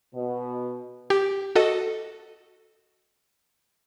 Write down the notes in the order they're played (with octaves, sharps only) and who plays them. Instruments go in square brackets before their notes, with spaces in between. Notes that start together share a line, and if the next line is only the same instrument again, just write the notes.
[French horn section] B2
[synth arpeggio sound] G4
F#4 A4 D#5